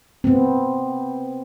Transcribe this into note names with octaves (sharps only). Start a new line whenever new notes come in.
B3 C4